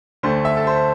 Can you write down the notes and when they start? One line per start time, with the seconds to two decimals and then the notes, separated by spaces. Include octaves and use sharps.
0.23 D2 D3 A3 C5
0.45 E5
0.57 A4
0.67 C5